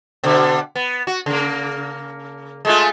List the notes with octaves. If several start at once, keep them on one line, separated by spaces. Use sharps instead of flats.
B2 D3
B3
F#4
C#3 A#3
G#3 A3 F4